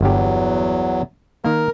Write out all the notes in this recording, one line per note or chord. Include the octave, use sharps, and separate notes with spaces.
G1 E2 G2 F#3 G4
D#3 A#3 A#4